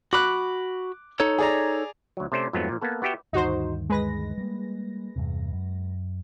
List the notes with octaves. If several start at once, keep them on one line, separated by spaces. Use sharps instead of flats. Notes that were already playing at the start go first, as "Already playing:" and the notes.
F#4 B5 D6 F#6
D#4 A4 C#5
G#4 D5 A#5
D2 F#3
C3 A3 C#4 C5 D5
F2 G#2 F#3 A3 B3 C4
A#2 F3
A#3 B3 A4
B3 F#4 G4 E5 G5
D2 G2 D#3 D#4 F#4 C5
G#3 B4 A#6
G3 A#3
E2 G2 C3
F#2